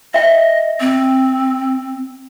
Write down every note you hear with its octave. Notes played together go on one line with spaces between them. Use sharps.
D#5 E5 G5
C4